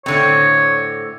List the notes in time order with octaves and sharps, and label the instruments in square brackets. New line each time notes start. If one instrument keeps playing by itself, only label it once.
[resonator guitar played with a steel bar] A2 D3 C4 [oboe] C#5